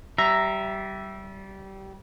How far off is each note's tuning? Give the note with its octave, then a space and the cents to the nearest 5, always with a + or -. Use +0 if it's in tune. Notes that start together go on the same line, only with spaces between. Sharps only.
G3 -20 E5 +5 A#5 +0